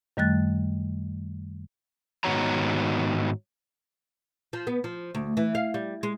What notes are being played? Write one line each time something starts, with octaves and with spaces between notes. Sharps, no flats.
F#2 D#3 G3 A3 F#6 A6
G#2 D#3 B3 F#4 C#5 A#5
F3
B3
F3
D2
E3
F5
G3
G#3